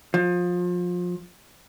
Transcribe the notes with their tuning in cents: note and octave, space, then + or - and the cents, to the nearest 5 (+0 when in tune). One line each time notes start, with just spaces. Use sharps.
F3 +25